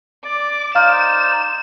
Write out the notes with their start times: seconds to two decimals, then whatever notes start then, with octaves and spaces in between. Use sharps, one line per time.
0.25 D5 D6
0.75 D#4 C5 D5 F5 F6 E7